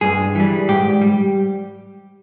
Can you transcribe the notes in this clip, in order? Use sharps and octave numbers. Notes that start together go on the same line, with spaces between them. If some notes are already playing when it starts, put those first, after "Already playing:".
G2 G#4
E3 G3
G#2 G4
G3